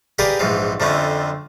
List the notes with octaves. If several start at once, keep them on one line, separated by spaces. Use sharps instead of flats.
G4 G#4 A#4 B4 D5 F5
A#1 G#2 E3 F3 F5
F2 D3 A3 C4 C#4 F4